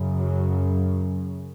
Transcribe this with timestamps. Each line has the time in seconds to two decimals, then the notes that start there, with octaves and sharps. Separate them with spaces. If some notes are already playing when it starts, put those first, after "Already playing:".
Already playing: F#2 C#3
0.15 F#3